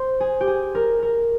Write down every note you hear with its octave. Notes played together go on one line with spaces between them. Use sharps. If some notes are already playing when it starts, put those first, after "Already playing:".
Already playing: C5
G#4
G4
G#4
A#4
A#4